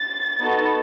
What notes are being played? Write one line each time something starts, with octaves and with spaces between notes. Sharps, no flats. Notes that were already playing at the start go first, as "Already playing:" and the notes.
Already playing: A6
B3 D#4 F#4 A4